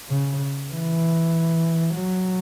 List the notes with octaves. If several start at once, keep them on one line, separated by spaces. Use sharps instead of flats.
C#3
E3
F#3